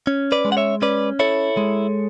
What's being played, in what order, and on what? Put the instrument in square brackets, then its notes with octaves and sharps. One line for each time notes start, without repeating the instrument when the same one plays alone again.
[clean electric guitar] C#4
B4 D5
G#3
F#5
C#5 E5
C#4 B4 D5
E4 A4 C#5
G#3